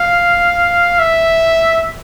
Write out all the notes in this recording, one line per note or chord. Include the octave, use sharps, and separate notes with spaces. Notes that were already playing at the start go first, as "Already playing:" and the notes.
Already playing: F5
E5